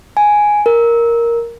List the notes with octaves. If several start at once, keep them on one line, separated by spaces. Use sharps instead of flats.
G#5
A#4